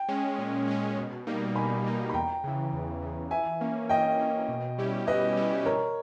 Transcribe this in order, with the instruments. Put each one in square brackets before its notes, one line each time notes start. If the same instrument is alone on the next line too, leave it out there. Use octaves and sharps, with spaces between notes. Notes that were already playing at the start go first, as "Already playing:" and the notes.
Already playing: [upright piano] G5
[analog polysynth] G#3 C#4
A#2
G#3 C#4
B2
G3 A#3 D#4
[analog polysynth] B2 [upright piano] G#5 B5
[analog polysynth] G3 A#3 D#4
[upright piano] B5
[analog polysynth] E2 [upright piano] G5 A#5
[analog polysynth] C#3 E3
E2
C#3 E3
[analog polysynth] E3 [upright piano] E5 G#5
[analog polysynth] A#3 C#4
[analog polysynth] E3 [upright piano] D#5 G5
[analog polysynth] A#3 C#4
B2
G3 C#4 E4 G4
[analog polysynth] B2 [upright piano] B4 D#5
[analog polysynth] G3 C#4 E4 G4
[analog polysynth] E3 [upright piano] A#4 C#5